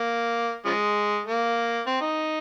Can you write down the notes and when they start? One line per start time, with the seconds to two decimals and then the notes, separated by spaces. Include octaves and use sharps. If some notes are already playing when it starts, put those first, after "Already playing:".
Already playing: A#3
0.65 C#3 F3 G#3
1.26 A#3
1.86 C4
2.01 D#4